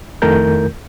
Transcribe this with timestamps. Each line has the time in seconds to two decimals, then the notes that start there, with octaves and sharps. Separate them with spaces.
0.22 F2 D#3 A3 E4 A#4 G6